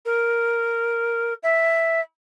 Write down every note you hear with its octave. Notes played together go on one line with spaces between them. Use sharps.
A#4
E5